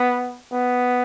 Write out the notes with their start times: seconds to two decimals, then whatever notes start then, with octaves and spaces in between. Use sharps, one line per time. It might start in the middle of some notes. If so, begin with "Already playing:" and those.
Already playing: B3
0.53 B3